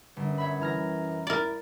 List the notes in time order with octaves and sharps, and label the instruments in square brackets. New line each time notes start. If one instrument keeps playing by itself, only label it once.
[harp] G1 [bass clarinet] F#2
[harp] C#5 E5 B5
[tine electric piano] E3 F6 A#6 [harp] A#5 G#6
[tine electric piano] E4 [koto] A#4 D5